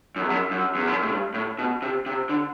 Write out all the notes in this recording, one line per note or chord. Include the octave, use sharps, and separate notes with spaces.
F#2
E2
F#2
F#2
E2
F#2
A2
G2
A2
B2
C3
C3
D3